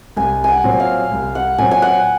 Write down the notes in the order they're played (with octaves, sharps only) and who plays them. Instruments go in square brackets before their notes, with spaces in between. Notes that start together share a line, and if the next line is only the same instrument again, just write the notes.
[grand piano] C2 [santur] G#5
[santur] F#5 G#5
[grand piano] A#2 F#3 C4
[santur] F5
[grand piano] C2
[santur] F#5
[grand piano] A#2 F#3 C4 [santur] G#5
[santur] G#5
F#5